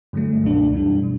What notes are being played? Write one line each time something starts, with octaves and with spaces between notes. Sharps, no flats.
G2 D3 F#3 A3
C#2 B2 A3 D4
F#2 E3 G3 D4
B2